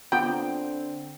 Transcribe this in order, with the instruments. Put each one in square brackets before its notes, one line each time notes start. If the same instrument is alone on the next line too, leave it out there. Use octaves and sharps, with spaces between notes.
[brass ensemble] D3 C4 [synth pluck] B3 F4 A#5 [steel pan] G5